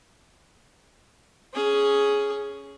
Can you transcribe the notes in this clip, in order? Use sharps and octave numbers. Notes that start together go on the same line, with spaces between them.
C#4 G#4